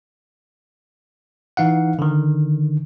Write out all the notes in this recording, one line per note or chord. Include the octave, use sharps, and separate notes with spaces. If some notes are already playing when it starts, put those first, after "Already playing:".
E3 D#4 F5 F#5
D3 D#3